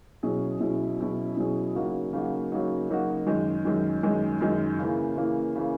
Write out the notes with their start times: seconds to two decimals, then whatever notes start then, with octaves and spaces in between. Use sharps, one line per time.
0.23 B2 F#3 C#4 E4 G#4
0.60 B2 F#3 C#4 E4 G#4
0.99 B2 F#3 C#4 E4 G#4
1.37 B2 F#3 C#4 E4 G#4
1.75 C#3 F#3 A#3 D#4 F#4
2.13 C#3 F#3 A#3 D#4 F#4
2.51 C#3 F#3 A#3 D#4 F#4
2.90 C#3 F#3 A#3 D#4 F#4
3.27 F#2 D#3 G#3
3.65 F#2 D#3 G#3
4.03 F#2 D#3 G#3
4.41 F#2 D#3 G#3
4.79 C#3 E3 A#3
5.17 C#3 E3 A#3
5.55 C#3 E3 A#3